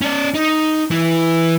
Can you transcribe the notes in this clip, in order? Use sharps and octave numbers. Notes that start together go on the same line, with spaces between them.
C#4 D5
D#4
E3 E4